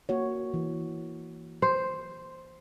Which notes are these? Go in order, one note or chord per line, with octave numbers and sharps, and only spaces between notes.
A#3 F#4 C#5
E3
C5